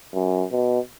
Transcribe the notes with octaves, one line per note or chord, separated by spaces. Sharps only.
F#2
B2